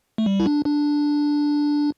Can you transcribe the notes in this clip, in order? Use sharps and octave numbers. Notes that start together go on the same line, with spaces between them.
A3
G3
E4
D4
D4